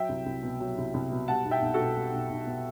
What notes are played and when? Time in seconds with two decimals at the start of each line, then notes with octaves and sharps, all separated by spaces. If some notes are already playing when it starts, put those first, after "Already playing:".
Already playing: F#3 E5 G5
0.09 C2
0.26 C2
0.43 B2
0.60 F#3
0.78 C2
0.94 C2
1.11 B2
1.28 G3 F#5 A5
1.45 B1
1.51 E5 G5
1.62 B1
1.74 F#4 A4
1.80 B2
1.96 G3
2.14 B1
2.29 B1
2.46 B2